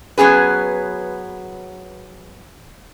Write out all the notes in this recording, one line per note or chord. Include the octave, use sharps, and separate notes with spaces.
F#3 B3 C#4 G#4 B4